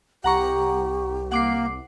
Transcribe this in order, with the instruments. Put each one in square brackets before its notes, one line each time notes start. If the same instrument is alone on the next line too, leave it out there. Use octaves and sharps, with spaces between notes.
[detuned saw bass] C2 [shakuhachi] G4 [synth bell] F#5 A#5 C#6
[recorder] A#3 [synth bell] F#5 D6 C7